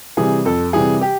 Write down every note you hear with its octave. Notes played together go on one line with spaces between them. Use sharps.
C3 E3 G3 G#4
F2 A4
C3 E3 G3 G#4
G4